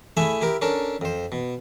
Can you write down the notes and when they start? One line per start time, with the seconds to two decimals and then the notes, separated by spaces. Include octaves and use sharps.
0.17 A3 E4 G#4 E5 G#5 B5
0.41 E4 G4 A#4
0.62 C#4 D4 A4 A#4
1.01 F2 C5
1.32 B2